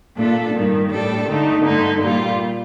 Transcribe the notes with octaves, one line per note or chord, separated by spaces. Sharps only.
A#2 A3 D4 A4
G2 D#3 G3
A2 G3 D4 A4
D3 A3 D#4
G2 D3 A3 D#4
A#2 G3 A#3 F4